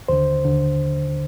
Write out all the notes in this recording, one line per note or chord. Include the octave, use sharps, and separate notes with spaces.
D#2 D3 C5
D#2 D3